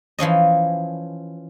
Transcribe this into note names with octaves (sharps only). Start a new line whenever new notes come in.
E3 F3 C#4 D#5